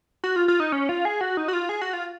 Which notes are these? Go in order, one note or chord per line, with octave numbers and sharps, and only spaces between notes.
F#4
F4
F4
D#4
C#4
F4
G#4
F#4
D#4
F#4
F4
G#4
F#4
F4